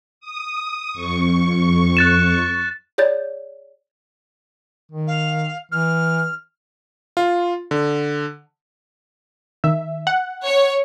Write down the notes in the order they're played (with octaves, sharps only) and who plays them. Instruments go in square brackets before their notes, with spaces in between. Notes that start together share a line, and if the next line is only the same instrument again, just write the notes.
[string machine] D#6
F2 C#6
[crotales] F#6 A6 E7
[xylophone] G#4 C#5 D5 G6 A6
[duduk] D#3
[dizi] F5
[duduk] E3 [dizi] F6
[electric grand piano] F4
D3
[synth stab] D#3 E5
F#5
[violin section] C#5